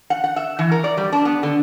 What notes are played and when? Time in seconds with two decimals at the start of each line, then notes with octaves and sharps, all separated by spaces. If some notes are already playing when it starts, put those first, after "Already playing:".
0.10 F#5
0.24 F#5
0.36 E5
0.59 E3
0.71 A#4
0.84 D5
0.97 G3
1.12 D4
1.25 B3
1.43 D3